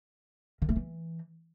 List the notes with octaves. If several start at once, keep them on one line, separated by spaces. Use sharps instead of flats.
D#3
A3
E3